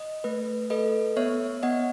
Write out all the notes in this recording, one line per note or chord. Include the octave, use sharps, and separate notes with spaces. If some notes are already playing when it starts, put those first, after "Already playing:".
Already playing: D#5
A3 B4
A4 B4 D#5
B3 C#5 E5
B3 D#5 F#5